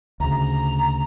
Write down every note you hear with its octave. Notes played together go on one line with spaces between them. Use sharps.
D2 C#3 A#5